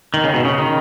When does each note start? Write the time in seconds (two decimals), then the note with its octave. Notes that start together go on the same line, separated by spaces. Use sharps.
0.14 D#3
0.24 C#3
0.34 B2
0.45 C#3
0.59 D#3